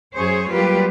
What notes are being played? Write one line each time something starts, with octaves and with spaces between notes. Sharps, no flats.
F#2 G#4 C5 C#5
F#3 G3 A#3 F4 G4 B4